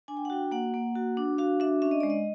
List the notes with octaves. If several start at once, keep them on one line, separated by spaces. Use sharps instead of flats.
D4 G#5
G5
F#5
F#4 G5
A#3 F#5
A#3
F#4
D4
F#4 F5
D4 E5
C#4 E5
D#5
G#3 D5
D#5